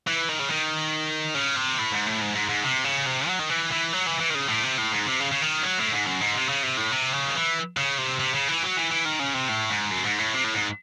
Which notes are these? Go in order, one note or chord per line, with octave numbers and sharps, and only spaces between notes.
E3
D#3
C#3
D#3
C#3
C3
A2
G#2
A2
G#2
G#2
G#2
C3
C#3
C3
F#3
D#3
E3
E3
F#3
E3
E3
D#3
C#3
A2
C3
A2
G#2
C3
C#3
C#3
D#3
F#3
A2
G#2
F#2
G#2
C3
C#3
C3
A2
C3
C#3
D#3
E3
C#3
C3
C3
C#3
E3
F#3
E3
E3
D#3
C#3
C3
A2
G#2
F#2
G#2
A2
C3
A2
G#2